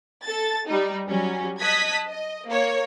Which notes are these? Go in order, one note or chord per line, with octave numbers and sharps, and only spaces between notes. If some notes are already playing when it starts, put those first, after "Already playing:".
A4 A6
G3 D#4
F#3 G3 C#4
D#5 A5 D#6 F#6 G#6 B6
D#5
A#3 C#5